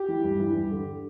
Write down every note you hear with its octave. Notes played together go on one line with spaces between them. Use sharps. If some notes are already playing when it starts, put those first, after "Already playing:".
Already playing: G4
E3
G2
E3
G2
D3